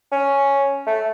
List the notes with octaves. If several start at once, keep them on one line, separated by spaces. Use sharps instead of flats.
C#4
A3